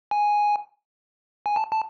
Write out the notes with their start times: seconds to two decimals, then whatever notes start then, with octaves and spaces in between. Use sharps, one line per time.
0.11 G#5
1.46 G#5
1.56 A5
1.72 A5